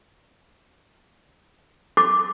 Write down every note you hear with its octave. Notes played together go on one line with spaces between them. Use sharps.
D6